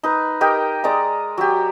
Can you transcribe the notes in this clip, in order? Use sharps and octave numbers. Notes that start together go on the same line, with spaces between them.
D#4 B4
G4 A#4 D#5 G5
G#3 D5 D#5 A#5
F#3 G4